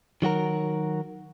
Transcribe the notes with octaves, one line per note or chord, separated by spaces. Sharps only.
D#3 F#3 F#4 A#4